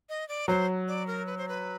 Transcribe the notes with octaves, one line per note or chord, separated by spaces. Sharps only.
D#5
D5
F#3 C5
D5
A#4
B4
C5
B4